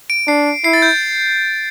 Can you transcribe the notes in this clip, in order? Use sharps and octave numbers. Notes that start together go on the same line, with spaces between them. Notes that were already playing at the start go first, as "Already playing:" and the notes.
D7
D4 C7
E4 C7
A6
G6